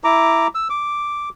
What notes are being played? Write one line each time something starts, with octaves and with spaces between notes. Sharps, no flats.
E4 A#5 D6
E6
D6